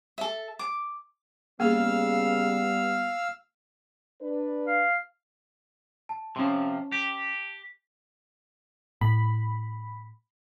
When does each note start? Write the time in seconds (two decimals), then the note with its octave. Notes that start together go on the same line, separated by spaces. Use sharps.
0.18 A4 E5
0.59 D6
1.60 C#3 G3 A#3 B3 G#4 F5 E6 F6
4.21 D4 B4
4.67 F5
6.09 A5
6.36 C3 F3 C#4 C6
6.92 G4
9.01 A2 B5